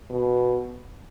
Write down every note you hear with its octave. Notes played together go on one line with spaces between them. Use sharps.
B2